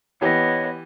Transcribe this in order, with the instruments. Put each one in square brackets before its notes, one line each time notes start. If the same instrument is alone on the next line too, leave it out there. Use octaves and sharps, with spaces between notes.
[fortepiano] E3 G4 [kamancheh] B3 [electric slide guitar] C#5 D#5